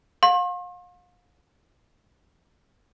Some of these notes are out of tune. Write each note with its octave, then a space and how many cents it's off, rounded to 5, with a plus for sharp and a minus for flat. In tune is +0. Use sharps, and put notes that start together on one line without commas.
F5 +35 C6 +45